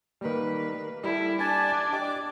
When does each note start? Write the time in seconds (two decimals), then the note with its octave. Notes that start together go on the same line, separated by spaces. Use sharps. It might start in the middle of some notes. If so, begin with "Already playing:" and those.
0.21 D#3 G3 A#3 B4
1.04 G3 E4 A4
1.40 D4 G#5 A5
1.93 G4 D5 D#5 D6